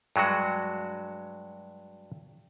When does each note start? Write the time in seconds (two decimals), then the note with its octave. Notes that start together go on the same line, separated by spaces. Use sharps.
0.16 G2 F#3 G#3 F#4